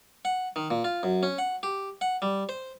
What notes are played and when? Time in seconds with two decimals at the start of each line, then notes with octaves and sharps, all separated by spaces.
0.25 F#5
0.56 D#3
0.70 A#2
0.84 F4
1.03 F#2
1.23 C#4
1.38 F#5
1.63 G4
2.01 F#5
2.22 G3
2.49 C5